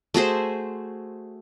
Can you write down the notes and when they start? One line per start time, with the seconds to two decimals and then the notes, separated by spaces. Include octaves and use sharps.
0.14 A3 F#4 G#4 C5